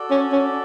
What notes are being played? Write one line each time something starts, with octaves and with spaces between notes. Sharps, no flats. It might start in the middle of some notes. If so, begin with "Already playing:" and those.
Already playing: F#4 A4 D5
C#4
C#4